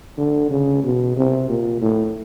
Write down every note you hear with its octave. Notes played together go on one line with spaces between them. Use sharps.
D3
C#3
B2
C3
A#2
A2